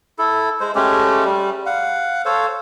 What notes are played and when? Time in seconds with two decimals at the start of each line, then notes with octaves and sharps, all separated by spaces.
0.19 E4 A4
0.60 G#3 C5
0.75 G#3 A3 C#4 G4
1.25 G3
1.66 F5 F#5
2.25 A4 C5 C#5 F5